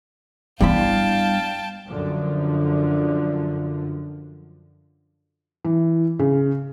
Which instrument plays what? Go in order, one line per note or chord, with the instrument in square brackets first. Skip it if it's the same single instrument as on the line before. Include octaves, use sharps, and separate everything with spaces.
[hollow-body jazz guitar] G2 B5 [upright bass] B3 E4 [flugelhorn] F5 [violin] G5 A5
[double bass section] F#2 D3 F3
[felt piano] E3
C#3